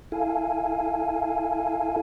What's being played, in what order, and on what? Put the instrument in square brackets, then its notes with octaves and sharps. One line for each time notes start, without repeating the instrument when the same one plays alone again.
[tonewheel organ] E4 A4 F5 G#5